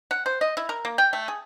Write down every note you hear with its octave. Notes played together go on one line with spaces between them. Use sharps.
F#5
C5
D#5
E4
A#4
A#3
G5
A3
G#4